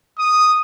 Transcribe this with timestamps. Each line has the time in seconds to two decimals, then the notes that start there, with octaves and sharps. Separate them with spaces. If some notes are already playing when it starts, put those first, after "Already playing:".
0.19 D#6